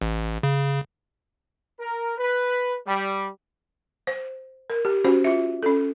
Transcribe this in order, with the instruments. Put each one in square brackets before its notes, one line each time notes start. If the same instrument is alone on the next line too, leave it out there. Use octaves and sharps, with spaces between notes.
[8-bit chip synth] A1
C#3
[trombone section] A#4
B4
G3
[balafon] C5
A#4
G4
C#4 F#4 C5
F4 E5
C#4 A4